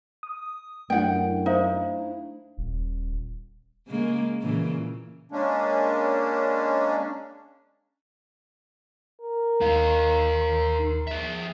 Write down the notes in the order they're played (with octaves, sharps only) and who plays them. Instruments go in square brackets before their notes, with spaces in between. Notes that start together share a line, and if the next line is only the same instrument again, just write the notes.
[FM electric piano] D#6
[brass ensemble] F#2 [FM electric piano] A3 D4 E4 [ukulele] F#5 G5
[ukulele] D#4 [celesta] C5 E5 F5
[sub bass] D#1
[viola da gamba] C#3 G#3 A#3
A#2 C#3 E3
[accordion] G#3 A#3 C#4 D4
[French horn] A#4
[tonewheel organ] D#2 C6 [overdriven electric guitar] D#4 F5
[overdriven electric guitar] G#4 E5